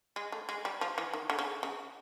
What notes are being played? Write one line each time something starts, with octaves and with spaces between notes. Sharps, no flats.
G#3
A3
G#3
G3
F3
E3
D#3
D3
C#3
C#3